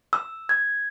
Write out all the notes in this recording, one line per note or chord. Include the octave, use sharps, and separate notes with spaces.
E6
G#6